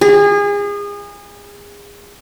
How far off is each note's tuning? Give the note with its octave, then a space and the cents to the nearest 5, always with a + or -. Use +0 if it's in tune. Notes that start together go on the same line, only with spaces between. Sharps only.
G#4 -30